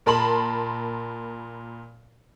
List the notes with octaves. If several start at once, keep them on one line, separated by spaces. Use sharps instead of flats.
A#2 A#4 A5 B5 C6 F#7